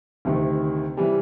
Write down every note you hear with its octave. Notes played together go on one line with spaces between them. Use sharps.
D2 C3 D#3
C3 E3 G3